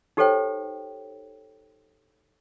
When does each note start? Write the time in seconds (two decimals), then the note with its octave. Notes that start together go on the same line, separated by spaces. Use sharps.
0.17 D#4 G4 A4 C5 C#5 G5